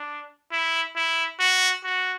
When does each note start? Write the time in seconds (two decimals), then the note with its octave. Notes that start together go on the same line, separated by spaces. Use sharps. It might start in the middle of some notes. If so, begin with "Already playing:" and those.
Already playing: D4
0.52 E4
0.96 E4
1.39 F#4
1.84 F#4